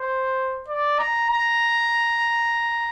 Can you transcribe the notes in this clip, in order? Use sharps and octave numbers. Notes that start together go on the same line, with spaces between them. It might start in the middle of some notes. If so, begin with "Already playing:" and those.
Already playing: C5
D5
A#5
A#5